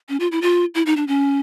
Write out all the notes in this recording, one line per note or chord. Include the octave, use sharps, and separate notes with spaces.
C#4
F4
E4
F4
E4
D#4
D4
C#4